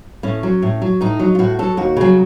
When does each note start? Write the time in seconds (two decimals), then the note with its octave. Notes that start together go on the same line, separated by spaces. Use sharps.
0.23 A2 C#4
0.43 F#3
0.62 A2
0.82 F#3
1.01 A2 D#4
1.20 F#3
1.35 F4
1.39 A2 F#4
1.59 F#3 A4
1.77 D#2 F#4
1.97 C#3 F#3